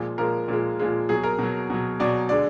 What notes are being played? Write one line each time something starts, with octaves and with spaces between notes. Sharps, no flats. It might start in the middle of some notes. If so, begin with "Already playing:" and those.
Already playing: A#2 F3 G#3
A#2 F3 G#3 A#4
A#2 F3 G#3
A#2 F3 G#3
B2 F#3 G#4
A#4
B2 F#3
B2 F#3
B2 F#3 D5
D3 G#3 D5